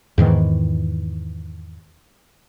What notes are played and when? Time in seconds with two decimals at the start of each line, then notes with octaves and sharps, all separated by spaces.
0.18 E2 G#2 D#3 E3